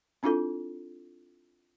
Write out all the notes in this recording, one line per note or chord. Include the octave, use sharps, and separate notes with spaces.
C4 D4 E4 F4 A4